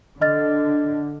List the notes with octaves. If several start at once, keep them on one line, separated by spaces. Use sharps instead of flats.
D3 D#5 F6 A6